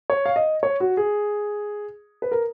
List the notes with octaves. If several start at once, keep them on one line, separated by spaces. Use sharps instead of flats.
C#5
F5
D#5
C#5
F#4
G#4
B4
A#4